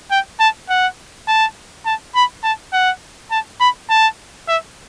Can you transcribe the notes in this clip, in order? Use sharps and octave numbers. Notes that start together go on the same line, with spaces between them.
G5
A5
F#5
A5
A5
B5
A5
F#5
A5
B5
A5
E5